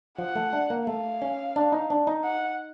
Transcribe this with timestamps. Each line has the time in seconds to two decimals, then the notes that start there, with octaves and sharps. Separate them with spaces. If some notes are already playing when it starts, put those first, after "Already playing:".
0.18 F3 F#5
0.36 A3
0.53 D4
0.70 A#3
0.87 A3 F5
1.22 C#4
1.56 D4
1.72 D#4
1.90 D4
2.07 D#4
2.24 F#5